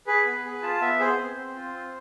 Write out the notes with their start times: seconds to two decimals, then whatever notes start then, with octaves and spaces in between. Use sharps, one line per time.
0.07 G#4 B4
0.25 B3
0.45 G#4
0.62 F4 A5
0.81 B3 E5
1.00 G#4 C5
1.18 C4
1.37 C4
1.55 F4
1.74 C4